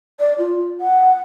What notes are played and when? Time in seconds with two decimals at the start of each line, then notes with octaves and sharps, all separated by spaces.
0.20 D5
0.38 F4
0.80 F#5